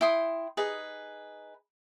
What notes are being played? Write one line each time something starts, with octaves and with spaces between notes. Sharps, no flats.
E4 G5 C6 D#6
D#4 G#4 B4